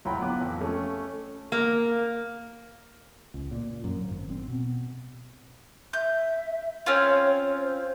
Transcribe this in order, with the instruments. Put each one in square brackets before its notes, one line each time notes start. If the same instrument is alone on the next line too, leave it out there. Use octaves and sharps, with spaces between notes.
[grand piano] D1 F#3 E4 F4 G5 B5
B3 B4 D6
F2
A3 C#4
[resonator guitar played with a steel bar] A#3
[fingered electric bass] C#2
A#2
F#2
G#1
C4
B2
[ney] E5 [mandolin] G6
[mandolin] C4 C#4 F4 [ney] C#5
[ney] C5